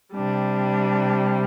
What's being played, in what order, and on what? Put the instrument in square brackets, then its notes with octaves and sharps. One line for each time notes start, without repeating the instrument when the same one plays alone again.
[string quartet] C3 G3 D4